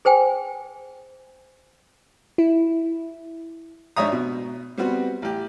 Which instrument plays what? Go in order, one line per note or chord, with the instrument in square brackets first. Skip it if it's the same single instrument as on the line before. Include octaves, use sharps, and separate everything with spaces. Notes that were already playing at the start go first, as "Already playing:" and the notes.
[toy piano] G#4 C5 G5 G#5
[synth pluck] E4
[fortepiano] G#1 D4 C#5 E5 A#5 D#6
B2
G3 B3 C4 F#4
A1 G4